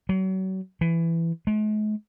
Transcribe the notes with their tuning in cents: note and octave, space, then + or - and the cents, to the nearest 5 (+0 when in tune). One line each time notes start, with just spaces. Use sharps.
F#3 +35
E3 +15
G#3 +45